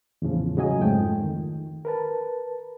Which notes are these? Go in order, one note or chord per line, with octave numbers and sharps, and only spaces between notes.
E2 A2 C#3 F3
C#3 F#3 D#5 G#5 D#6
F2 G#2 F3 A3 G5
D#3
A#4 B4 A5